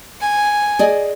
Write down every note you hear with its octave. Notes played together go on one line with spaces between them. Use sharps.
G#5
G#4 D5 D#5